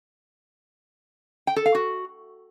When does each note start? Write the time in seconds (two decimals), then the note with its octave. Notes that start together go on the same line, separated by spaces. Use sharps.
1.47 G5
1.56 A4
1.66 F5
1.75 F#4